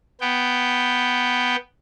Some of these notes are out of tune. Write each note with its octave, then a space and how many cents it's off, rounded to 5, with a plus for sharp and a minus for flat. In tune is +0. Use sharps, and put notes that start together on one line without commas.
B3 +0 G5 +0